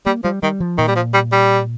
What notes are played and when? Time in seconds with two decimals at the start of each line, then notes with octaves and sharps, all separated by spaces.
0.06 G3 A#3
0.24 F3 G3
0.43 D#3 G3
0.60 F3
0.78 A#2 D#3
0.87 G3
0.96 F3
1.14 G3
1.32 G3